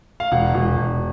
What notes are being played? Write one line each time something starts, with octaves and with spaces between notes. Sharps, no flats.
F5
E1 F#5
E1
E1